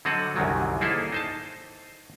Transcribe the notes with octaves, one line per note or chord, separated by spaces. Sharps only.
D3 F#3 C4 A4 D#5 F#5
C2 F#2 D3 D#3 F#3
A#3 D#4 E4 G#4 A4 C5
D#4 C5 A5